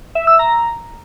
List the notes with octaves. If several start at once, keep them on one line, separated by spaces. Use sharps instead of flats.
E5
E6
A#5